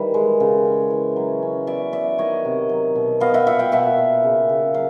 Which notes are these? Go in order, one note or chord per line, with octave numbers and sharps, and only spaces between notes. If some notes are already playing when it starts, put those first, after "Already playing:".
Already playing: D#3 E3 G3 B4
G#3
C#3
C#4
E3
F#3
C#4
B3 D5 E5
B3 D5 E5
D#3 C#5 D#5
C3
F#3
B2
B3 D#5 F5
E5 F#5
A#2 E5 F#5
F5 G5
B2 E5 F#5
A#3
C#3
C#3
F#3 F5